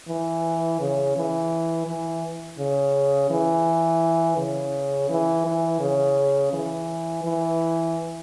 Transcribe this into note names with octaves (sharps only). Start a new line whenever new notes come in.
E3
C#3
E3
E3
C#3
E3
C#3
E3
E3
C#3
E3
E3